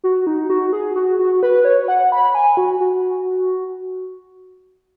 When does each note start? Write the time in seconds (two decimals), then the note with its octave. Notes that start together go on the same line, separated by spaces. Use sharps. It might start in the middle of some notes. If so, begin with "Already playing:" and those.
0.04 F#4
0.27 D#4
0.50 F#4
0.73 G#4
0.96 F#4
1.19 F#4
1.43 B4
1.65 C#5
1.88 F#5
2.12 B5
2.35 G#5
2.57 F#4
2.80 F#4